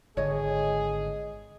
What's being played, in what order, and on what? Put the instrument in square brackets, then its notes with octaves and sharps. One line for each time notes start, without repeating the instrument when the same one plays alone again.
[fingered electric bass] G#1 D3 [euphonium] G#3 [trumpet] G#4 [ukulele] C#5 D#5